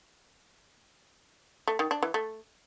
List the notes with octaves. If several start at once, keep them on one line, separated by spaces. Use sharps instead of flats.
A3
D#3
D4
E3
A3